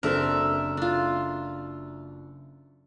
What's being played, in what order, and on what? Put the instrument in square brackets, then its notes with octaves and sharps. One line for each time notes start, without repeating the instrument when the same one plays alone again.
[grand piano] F#1 A4 [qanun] C4 D4 [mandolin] A#4 E5
[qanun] D4 F4